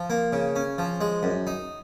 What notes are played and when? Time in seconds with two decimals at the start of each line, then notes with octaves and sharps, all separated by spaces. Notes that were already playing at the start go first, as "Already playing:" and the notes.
Already playing: F3
0.10 A#3
0.33 C#3
0.56 C#4
0.78 F3
1.01 G#3
1.23 F#2
1.47 D#4